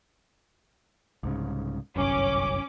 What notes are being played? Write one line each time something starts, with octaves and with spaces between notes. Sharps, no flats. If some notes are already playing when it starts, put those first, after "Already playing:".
C2 G#2 C#3
G1 C2 F#2 C#4 D6